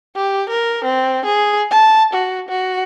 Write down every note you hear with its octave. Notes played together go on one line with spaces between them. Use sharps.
G4
A#4
C4
G#4
A5
F#4
F#4